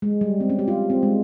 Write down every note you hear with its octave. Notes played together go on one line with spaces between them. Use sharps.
G#3
G3
C4
C#4
G4
F4
C4
G#3